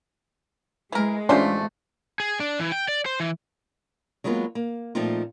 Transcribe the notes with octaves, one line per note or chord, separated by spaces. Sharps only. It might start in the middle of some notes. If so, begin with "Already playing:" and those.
E3 G#3 A#4
A1 C#3 A3 C#4 D4 F4 C5 C6
G#4
D4
E3
G5
D5
C5
E3
F#3 G#3 A#3 B3 F4
A#3
A#2 F3 A3 C4 D#4 F4